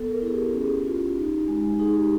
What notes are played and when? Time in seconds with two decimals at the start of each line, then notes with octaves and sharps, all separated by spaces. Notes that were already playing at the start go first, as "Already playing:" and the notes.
Already playing: B3 A4
0.11 A#4
0.21 E4
0.27 G#4
0.31 G4
0.53 C#4
0.85 F4
1.16 D#4
1.48 G#3
1.79 D#4 G#4
1.95 G4